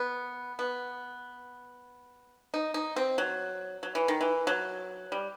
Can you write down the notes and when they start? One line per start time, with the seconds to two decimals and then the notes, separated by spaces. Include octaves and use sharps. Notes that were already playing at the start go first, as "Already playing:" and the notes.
Already playing: B3
0.59 B3
2.54 D#4
2.74 D#4
2.96 C4
3.18 F#3
3.83 F#3
3.95 E3
4.08 D#3
4.21 E3
4.47 F#3
5.12 G3